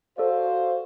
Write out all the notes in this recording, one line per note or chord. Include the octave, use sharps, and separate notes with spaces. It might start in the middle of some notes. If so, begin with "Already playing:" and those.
F#4 A4 C5 D5 F5